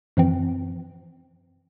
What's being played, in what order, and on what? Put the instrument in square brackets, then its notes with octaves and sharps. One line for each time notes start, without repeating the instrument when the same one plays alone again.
[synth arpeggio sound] F#2 E3 F3 C4